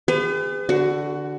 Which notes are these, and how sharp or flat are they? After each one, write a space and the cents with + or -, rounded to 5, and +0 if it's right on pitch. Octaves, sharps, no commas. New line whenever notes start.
G#4 -35 B4 +40
D3 +0 F#4 +15